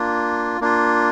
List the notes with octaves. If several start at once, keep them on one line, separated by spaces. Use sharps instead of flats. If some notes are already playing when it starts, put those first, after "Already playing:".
Already playing: A#3 D4 F4
A#3 D4 F4